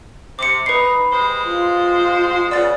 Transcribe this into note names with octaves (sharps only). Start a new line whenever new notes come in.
C3 D6 C#7
D#4 B4 B5 C7
C3 G#3 C5
F4
C#3 B3 D5 A6